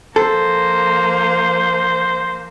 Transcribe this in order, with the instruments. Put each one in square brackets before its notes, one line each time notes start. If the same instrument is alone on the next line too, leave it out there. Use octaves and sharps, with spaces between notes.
[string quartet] F3 A#3 [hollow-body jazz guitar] A4 [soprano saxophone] C5